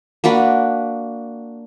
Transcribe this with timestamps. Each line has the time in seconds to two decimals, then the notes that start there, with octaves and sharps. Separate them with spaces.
0.24 A#3 D4 F#4 B4